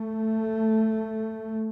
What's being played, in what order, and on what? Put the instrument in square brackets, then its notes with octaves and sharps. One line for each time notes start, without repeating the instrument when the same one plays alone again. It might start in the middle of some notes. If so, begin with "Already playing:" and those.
Already playing: [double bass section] A3